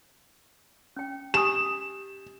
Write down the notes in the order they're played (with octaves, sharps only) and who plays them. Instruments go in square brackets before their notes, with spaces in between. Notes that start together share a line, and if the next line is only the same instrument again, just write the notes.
[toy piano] C#4 G5
[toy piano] G4 G#5 D#6 [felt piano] E7